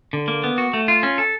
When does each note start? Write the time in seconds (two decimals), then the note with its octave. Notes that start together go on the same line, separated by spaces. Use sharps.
0.13 D3
0.28 A#3
0.44 B3
0.58 F#4
0.73 A3
0.88 F4
1.03 C#4
1.18 A4